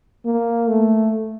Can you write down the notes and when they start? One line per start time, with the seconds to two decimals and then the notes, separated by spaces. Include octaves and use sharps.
0.25 A#3
0.68 A3